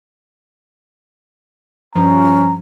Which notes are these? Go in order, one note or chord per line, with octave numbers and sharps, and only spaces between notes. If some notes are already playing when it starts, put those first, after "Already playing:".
G2 F3 C#4 A#5